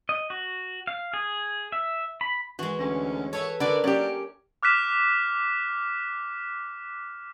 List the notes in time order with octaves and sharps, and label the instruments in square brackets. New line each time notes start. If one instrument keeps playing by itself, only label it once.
[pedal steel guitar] D#5
F#4
F5
G#4
E5
B5
[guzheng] E3 G#3 [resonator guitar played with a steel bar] F#4
[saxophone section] D2 C#4
[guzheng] A4 B4 E5 [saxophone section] C#5
[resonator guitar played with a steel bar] D3 [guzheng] D4 A#4 C#5 [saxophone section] F#4 B4 D5
[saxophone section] F#3 A#3 D5 [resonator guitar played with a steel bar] C#4 G4
[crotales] D6 F6 F#6 B6 E7